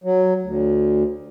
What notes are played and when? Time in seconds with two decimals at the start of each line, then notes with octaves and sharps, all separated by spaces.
0.04 F#3
0.42 D2